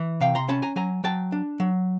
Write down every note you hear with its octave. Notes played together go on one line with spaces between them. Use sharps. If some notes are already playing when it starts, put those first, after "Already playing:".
Already playing: E3
C3 F5 G5
A#5 C6
C#4 A5 B5
G#5 A#5
F#3 G#5 A#5
F#3 G5 A5
D4
F#3